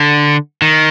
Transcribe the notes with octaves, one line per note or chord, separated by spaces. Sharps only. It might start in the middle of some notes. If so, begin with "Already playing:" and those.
Already playing: D3
D#3